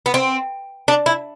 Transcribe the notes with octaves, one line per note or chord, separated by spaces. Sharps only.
B3
C4
D4
E4